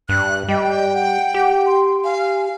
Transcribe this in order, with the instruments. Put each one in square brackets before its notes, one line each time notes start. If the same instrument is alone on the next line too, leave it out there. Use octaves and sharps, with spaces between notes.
[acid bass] G2 [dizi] F#6
[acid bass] G3 [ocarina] D#5 [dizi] G5
[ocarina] F#5
[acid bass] G4
[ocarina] C6
[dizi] F5 [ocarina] G#5